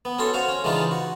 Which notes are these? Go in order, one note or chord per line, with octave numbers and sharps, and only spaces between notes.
B3
C#4 F#4 A4 C6
F#4 C5 F5
C#4
C#3 E3 G#3 D4 D#4 F4
F#4